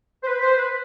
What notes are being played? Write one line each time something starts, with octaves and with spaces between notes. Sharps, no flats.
C5
B4
C5
B4